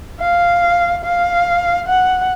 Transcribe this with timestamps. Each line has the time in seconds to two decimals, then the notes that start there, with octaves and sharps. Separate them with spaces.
0.20 F5
1.04 F5
1.88 F#5